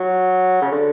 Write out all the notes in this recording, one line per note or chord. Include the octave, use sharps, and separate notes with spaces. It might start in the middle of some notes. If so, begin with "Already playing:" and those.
Already playing: F#3
C#3
D3